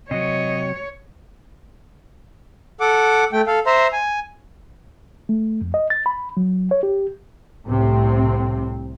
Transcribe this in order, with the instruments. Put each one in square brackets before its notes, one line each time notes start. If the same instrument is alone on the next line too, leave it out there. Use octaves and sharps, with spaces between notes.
[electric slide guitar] C3 F#3 [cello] C#5 [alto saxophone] D#5
[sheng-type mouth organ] A4 F#5 D6
A3 G5
A4 F5
C5 E5 A#5 C6
G#5
[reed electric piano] A3
F2
D#5
A6
B5
F#3
C#5
G4
[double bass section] C2 A2 C3 C4